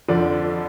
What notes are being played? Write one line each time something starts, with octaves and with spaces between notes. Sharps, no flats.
F2 D3 F3 D5